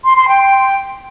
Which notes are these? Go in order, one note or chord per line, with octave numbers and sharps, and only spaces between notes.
C6
C6
G5